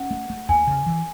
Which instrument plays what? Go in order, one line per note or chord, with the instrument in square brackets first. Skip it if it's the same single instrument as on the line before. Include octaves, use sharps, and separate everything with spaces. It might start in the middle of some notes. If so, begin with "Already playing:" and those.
Already playing: [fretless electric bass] C#4 [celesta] F#5
[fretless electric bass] A3
A3
[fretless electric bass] D#2 [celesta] G#5
[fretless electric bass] C#3
E3